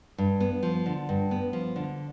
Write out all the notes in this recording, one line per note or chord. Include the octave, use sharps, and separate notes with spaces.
G2
B3
F3
D3
G2
B3
F3
D3